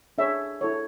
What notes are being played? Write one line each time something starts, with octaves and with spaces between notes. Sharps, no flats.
D4 G#4 C#5 E5
E4 A4 C#5